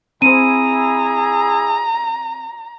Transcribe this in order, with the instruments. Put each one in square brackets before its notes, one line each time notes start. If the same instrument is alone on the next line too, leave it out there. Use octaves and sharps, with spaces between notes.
[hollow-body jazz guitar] C4 C5 [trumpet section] E4 G#4 [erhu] A#5 [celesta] D#7